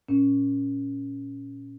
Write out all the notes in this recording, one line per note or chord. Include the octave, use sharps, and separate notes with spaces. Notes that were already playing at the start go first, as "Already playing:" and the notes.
A#2 C#4